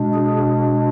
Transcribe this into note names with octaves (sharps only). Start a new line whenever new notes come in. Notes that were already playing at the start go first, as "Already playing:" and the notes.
Already playing: B2 G#3 D4
G#4